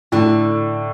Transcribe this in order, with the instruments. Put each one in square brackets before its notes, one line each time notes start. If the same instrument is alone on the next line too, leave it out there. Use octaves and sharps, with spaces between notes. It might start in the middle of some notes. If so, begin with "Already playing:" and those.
[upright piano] A2 [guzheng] D3